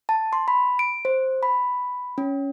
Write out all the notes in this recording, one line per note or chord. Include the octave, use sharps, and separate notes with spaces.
A5
C6
B5
D7
C5
B5
C#4